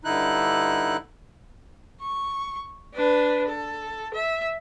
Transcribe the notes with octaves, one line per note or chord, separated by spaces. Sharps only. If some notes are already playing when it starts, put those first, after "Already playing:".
G2 D3 D#4 E4 F#6
C#6
D4 B4
A4
E5